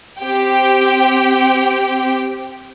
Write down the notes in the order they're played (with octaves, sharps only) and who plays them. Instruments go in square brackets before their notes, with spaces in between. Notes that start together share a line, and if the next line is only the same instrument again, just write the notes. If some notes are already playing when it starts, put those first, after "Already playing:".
[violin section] C4 G4 G5